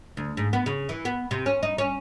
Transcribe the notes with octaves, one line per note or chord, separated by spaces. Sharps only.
D2
G#2
B3
C#3
E3
B3
C3
C#4
D#4
C#4